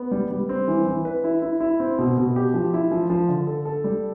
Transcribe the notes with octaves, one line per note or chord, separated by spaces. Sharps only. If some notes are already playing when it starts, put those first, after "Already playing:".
Already playing: B3
G3
G3
C4
E3
E3
B4
E4
E4
E4
C4
B2
B2
G4
F3
E4
F3
F3
D3
A4
A4
G3